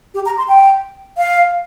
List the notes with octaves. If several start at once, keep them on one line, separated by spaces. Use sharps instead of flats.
G4
A#5
C6
G5
F5